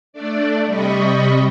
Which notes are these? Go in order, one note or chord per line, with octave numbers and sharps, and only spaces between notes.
A3 D4 D5
C3 G3 D#5 B5 C#6